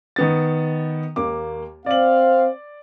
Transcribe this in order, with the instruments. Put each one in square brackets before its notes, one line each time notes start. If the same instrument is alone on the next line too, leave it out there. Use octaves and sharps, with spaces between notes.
[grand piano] D#3 B3 A6
D#2 A#3 D6
[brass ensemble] C4 F5 [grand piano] D5 F#7